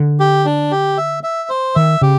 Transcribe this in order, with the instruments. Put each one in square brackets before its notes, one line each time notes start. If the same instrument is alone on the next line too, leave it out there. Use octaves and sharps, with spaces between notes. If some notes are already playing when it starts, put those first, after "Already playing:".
Already playing: [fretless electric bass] D3
[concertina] G4
D4
G4
E5
E5
C5
[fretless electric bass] D#3 [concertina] E5
[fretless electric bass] C#3 [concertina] G4